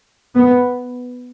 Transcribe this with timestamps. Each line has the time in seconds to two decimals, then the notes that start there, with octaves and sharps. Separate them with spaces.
0.35 B3